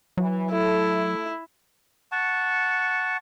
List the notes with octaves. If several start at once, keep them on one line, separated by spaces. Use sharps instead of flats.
E3 F#3
A3 E4 A4
F#5 A5 C#6